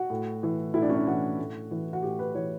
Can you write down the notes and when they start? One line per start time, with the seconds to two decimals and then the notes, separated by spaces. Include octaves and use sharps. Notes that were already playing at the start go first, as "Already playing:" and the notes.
Already playing: F#4
0.10 A2
0.43 E3
0.74 A2 E4
0.82 D4
0.89 C#4
0.96 D4
1.07 E3 F#4
1.39 A2
1.71 E3
1.93 F#4
2.03 A2 G4
2.19 B4
2.35 E3 C#5